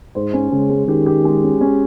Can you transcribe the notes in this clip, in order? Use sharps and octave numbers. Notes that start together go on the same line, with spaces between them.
G#2 C5
C#4
C#3 G#3
G#3
D#3 G4
G4
G#3
C#4
C#4